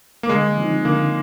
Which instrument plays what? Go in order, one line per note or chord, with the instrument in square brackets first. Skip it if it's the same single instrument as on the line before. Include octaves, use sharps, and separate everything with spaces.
[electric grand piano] A#3
[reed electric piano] D3 [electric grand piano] G#3
[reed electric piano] F3 C4 D#4
[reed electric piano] D3 [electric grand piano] A#3